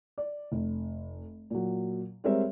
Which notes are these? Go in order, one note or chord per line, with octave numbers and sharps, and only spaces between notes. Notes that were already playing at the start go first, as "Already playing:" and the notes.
D5
F1
A#2 F#3
G3 G#3 C4 A#4 C#5 E5